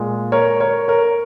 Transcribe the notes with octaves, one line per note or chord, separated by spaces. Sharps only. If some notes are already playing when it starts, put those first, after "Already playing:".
Already playing: A#2 G#3
A#4 C#5
A#4 C#5
A#4 C#5